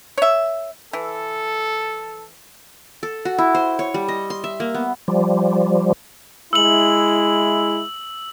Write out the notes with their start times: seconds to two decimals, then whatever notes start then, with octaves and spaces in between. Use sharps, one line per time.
0.18 C#5 E5
0.93 E3 A4
3.03 A4
3.25 F#4
3.38 E4
3.55 C5
3.79 C#5
3.94 G3
4.08 D#5
4.30 C6
4.44 E5
4.60 A#3
4.74 B3
5.08 F3 G3
6.53 G#3 E4 E6 F#7